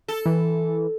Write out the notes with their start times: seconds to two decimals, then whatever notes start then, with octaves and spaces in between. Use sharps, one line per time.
0.08 A4
0.26 E3